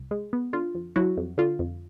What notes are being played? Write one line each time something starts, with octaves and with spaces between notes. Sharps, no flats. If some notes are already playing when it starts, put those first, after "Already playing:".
Already playing: C2
G#3
B3
D3 F4
F2
F#3 E4 F#4
F2
D3 F4
F2